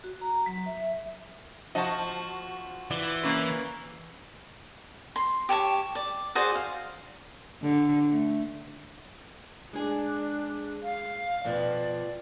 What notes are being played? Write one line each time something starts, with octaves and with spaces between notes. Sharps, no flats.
F#4
A#5
F#3
E5
E5
F3 F#4 D#5 A5
E3 D5
A#3 C#4 B4
C6
G4 C#5 A5 C#6
D5
F#4 G#4 C5 D5
F5
D3
A3
G#3 D4 G#4
F5
F2 B2 F3 D5